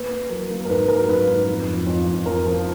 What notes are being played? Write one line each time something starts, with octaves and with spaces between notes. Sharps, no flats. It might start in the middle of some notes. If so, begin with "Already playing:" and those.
Already playing: A#3 B4
A#3
F#3 A#4
A#3
A#4
G#2 B4
F#3 A#4
G#2 B4
G#2
F2
F2
F2
F2
F2 A#4
F3